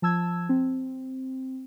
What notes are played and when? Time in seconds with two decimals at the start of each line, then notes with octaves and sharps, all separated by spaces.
0.02 F3 A5 E6 G#6
0.49 C4